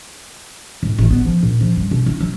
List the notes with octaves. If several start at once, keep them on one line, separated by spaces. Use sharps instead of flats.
A2
A1
B3
F3
A#2
F3
G2
B2
E4
F#3